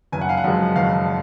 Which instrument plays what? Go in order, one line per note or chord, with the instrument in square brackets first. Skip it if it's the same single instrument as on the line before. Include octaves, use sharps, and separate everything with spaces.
[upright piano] F#1 G#5
F#5
F5
F#5
F#2 F3 G#3
F#1 F5